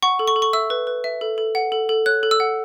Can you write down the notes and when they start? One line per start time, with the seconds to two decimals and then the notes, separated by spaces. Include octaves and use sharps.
0.02 F#5 C#6
0.19 A4
0.27 C#6
0.36 A4
0.42 C#6
0.53 E5 E6
0.70 B4
0.87 B4
1.04 E5
1.21 A4
1.38 A4
1.55 F#5
1.72 A4
1.89 A4
2.06 C#5 F#6
2.23 A4
2.31 E6
2.40 F#5